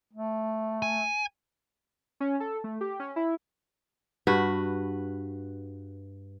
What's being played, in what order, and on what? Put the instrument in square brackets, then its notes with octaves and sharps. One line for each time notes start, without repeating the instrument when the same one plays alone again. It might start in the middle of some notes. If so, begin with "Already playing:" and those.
[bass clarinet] A3
[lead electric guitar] G#5
[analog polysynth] C#4
A4
A3
G4
C#4
E4
[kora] G2 F#4 B4